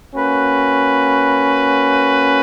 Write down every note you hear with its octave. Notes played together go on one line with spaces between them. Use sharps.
A#3 C#4 F#4 B4